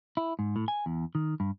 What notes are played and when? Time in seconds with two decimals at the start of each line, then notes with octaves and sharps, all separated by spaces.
0.17 E4
0.39 G#2
0.56 A2
0.68 G#5
0.86 E2
1.15 D#3
1.40 G2